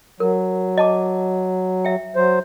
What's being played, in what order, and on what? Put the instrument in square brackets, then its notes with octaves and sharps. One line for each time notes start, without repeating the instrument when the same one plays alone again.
[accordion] F#3 [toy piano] A#4
[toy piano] D#5 A5 D6
E5 G5
[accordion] F#3 C5